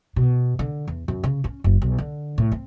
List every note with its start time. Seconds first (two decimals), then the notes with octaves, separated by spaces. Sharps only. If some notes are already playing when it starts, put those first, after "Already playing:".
0.16 B2
0.59 D3
0.88 E2
1.08 F#2
1.24 C#3
1.44 C#4
1.64 F#1
1.82 B1
1.98 D3
2.38 A2
2.52 C4